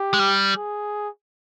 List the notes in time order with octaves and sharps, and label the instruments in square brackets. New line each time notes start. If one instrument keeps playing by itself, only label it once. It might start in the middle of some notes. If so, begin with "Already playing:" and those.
Already playing: [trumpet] G4
[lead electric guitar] G#3
G3
[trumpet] G#4